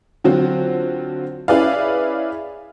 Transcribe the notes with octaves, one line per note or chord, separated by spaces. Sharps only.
D3 F#3 C4 F4 F#4
C#4 E4 G#4 B4 D5 F5